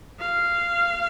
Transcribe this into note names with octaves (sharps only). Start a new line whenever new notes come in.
F5